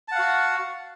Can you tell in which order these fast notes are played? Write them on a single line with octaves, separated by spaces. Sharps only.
A5 F#5 F5 F#4